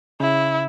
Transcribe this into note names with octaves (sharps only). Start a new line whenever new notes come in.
C#3 E4